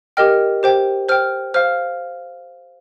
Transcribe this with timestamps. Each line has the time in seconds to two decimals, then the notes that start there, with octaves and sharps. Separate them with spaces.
0.17 G4 A#4 D#5 G5 F6
0.63 G4 C5 G5
1.08 C5 G5 F6
1.54 C5 F5 F6